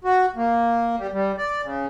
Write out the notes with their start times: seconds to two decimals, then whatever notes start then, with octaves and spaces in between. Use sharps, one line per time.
0.05 F#4
0.36 A#3
0.98 G3
1.12 G3
1.37 D5
1.62 C#3